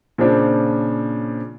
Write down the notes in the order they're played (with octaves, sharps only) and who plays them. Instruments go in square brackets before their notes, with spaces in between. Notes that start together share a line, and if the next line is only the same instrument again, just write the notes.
[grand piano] A#2 C#3 F3 C4 D4